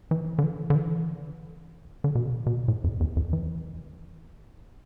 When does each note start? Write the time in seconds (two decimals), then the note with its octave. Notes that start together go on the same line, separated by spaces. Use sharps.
0.11 E3
0.38 D3
0.43 E3
0.70 D3
0.75 E3
2.04 D3
2.15 B2
2.25 C3
2.46 B2
2.68 A2
2.84 F2
3.00 E2
3.16 F2
3.33 E3